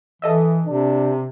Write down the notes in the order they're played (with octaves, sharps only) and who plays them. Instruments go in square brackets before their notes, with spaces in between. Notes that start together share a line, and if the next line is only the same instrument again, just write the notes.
[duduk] E3 [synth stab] A4 D#5 E5
[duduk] C3 [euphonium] D4